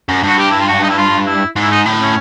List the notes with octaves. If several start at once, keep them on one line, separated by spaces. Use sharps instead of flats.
F#2
G2 F#4
G4
E4
F4
F#4
D#4
E4
F4
E4
G#2
E4
D#4
A2
C#4